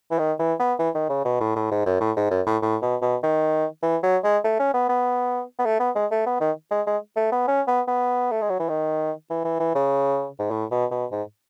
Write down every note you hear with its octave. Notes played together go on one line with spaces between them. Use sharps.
E3
D#3
E3
B3
E3
D#3
C#3
B2
A2
A2
G#2
F#2
A2
G#2
F#2
A2
A2
B2
B2
D#3
E3
F#3
G#3
A3
C#4
B3
B3
B3
A3
B3
G#3
A3
B3
D#3
G#3
G#3
A3
B3
C#4
B3
B3
A3
G#3
F#3
E3
D#3
E3
E3
E3
C#3
G#2
A2
B2
B2
G#2